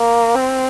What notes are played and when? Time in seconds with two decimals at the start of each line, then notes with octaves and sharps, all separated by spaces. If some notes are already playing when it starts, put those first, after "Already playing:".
Already playing: A#3
0.35 C4